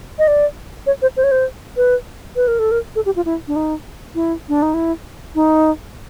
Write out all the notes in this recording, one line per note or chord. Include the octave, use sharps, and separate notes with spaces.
D#5
D5
C#5
C5
C5
C#5
C5
B4
B4
A#4
A4
A#4
A4
G4
F4
E4
D4
D#4
E4
D4
D#4
E4
D#4